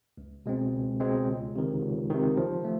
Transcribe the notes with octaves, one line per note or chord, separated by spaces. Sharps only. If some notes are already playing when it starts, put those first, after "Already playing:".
C#2
B2 G#3 C4
C#2
B2 G#3 C4
C#2
C3 D#3
C#2
C3 D#3
F3
A3